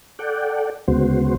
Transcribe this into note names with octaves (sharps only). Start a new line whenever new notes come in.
A4 D5 F#5 G5
D2 C#3 G#3 B3 F#4 C5